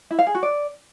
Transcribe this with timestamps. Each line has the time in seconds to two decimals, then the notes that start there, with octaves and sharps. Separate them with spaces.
0.11 E4
0.19 F5
0.27 G#4
0.35 F#4
0.43 D5